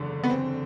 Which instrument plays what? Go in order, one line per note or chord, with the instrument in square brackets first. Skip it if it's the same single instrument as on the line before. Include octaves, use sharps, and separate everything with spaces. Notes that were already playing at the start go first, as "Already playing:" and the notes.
Already playing: [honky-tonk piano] F#1 E2 D3
B3
C4